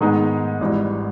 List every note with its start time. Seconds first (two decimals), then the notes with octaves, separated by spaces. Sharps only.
0.01 G#2 D#3 G#3 B3 D#4
0.61 G#1 G#2 E3 G3